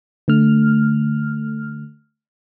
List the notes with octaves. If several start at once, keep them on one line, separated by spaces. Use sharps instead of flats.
D3 A3 F6